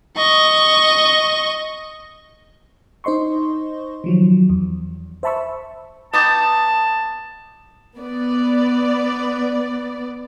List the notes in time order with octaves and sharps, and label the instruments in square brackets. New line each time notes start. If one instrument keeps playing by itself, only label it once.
[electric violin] D#5 C#6
[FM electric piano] D#4 C5 D#5 C6 C#6
D#3 F3 F#3
E2
C5 E5 A5 B5 C#6 E6
[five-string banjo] B3 D#4 G4 [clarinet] A5
[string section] B3 D5